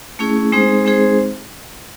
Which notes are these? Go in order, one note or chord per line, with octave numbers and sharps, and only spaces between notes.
A3 C#4 E4 G#4
G#3 C4 D#4 G#4 C5
G#3 C4 D#4 G#4 C5